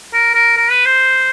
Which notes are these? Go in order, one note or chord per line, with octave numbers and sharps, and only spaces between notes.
A#4
A#4
A#4
B4
C5